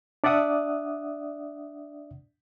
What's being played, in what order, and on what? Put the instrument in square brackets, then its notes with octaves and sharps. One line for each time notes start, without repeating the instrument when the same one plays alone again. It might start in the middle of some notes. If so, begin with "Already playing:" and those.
[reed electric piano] D4 D5 E5 F#5 D#6